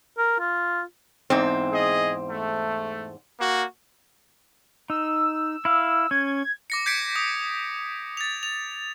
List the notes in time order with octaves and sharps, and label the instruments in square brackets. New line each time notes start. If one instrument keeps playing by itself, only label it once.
[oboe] A#4
F4
[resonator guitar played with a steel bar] E2 G#2 C4
[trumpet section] G#4 D#5
A3
A#3 F#4
[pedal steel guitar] D#4 [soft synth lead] E6
[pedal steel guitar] E4 F5
[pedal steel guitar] C#4 [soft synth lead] G#6
[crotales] D6 A#6 C#7
G6 G#6 B6 C#7 D7
D#6
A6 F7
F7